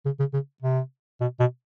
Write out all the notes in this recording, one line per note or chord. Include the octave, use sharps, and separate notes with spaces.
C#3
C#3
C#3
C3
B2
B2